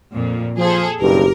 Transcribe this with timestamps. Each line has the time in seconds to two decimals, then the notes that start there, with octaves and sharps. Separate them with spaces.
0.15 F2 A#2
0.58 F3 G#4 A4
1.01 F#1 B1 G2 G4 A#4